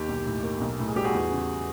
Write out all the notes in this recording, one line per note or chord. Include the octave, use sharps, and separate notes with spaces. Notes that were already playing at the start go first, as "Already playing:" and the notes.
Already playing: D#2 G4
B1
A2
A#3
B1
A2
G#4
G3 G4
F#4 G#4
E2
C#3